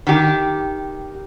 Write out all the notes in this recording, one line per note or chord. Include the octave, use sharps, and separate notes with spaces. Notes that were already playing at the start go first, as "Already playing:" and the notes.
D#3 G4